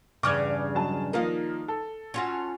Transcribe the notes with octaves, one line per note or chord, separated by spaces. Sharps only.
E2 G2 C#3 D6 F6 G#6
F#3 G#3 A5
D#3 F3 A#3 D#4 F5
A4
C#4 F4 F#4